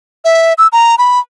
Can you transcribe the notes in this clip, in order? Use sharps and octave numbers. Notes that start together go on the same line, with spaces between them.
E5
E6
A#5
B5